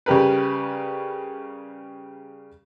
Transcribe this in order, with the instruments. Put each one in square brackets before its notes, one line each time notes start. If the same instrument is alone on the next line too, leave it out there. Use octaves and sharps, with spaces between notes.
[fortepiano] C#3 G3 G4 A#4 B4